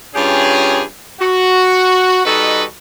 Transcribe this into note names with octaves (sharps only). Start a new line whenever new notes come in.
G2 C#4 F4 G4 G#4
F#4
G3 D#4 F#4 A4 B4 D#5